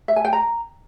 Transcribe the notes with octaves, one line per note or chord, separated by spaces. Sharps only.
E5
G#5
G5
A#5